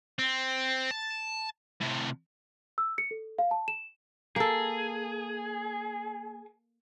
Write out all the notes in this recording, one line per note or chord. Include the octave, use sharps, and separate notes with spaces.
C4
A5
A2 C3
E6
C#7
A4
F5
A5
E7
A#3 G#4 A4